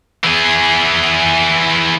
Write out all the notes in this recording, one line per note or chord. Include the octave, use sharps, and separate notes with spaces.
E3 G#4